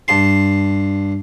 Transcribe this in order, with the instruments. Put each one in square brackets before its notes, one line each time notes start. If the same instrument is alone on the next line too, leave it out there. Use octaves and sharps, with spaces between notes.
[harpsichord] G2 A5 C6